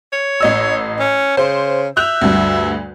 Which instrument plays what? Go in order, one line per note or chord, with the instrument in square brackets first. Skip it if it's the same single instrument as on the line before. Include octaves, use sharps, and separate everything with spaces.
[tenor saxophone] C#5
[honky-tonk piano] A1 D#5 E6
[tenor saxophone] C#4
[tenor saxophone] C#3 [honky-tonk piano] C5
[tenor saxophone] E5 [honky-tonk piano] F#6 G6 F7
[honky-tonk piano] D2 G2